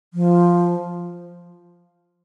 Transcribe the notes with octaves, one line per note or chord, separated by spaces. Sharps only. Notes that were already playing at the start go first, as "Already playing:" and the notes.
F3